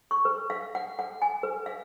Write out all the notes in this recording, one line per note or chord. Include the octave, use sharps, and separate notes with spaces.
C#6
B4
F5
F#5
F#5
G#5
B4
F5